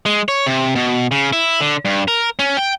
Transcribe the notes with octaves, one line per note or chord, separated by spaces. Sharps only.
G#3
C#5
C3
B2
C#3
E4
D3
G2
A#4
C#4
G5